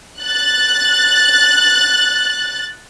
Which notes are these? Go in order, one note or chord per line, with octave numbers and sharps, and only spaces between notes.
F#6 A6